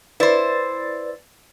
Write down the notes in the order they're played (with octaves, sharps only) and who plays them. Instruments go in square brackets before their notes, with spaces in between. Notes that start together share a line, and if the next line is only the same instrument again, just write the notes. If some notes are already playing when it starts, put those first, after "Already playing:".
[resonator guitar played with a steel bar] E4 C5 [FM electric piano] B4 D5 A6